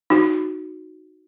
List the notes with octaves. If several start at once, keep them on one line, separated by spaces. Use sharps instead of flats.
D#4 F#4